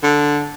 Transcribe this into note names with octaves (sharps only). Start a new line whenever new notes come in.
D3